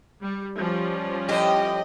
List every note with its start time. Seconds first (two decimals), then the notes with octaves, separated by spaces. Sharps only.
0.22 G3
0.57 F3 G3 C#4
1.29 A2 G4 D#5